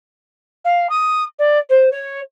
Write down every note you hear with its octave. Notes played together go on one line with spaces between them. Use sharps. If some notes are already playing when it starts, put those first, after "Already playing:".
F5
D#6
D5
C5
C#5